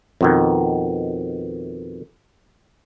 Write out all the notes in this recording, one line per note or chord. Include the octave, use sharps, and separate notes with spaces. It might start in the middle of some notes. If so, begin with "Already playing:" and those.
F2 B2 D#3